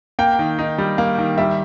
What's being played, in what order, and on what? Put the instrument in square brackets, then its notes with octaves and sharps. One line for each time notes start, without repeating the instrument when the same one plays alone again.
[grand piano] A#3 G5
D#3
D#4
G3
A#3
D#3
G3 E5